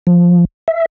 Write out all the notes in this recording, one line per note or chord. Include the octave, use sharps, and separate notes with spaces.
F3
E5